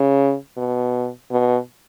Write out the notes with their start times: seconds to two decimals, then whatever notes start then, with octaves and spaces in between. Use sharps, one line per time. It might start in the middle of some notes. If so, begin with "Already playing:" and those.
Already playing: C#3
0.57 B2
1.31 B2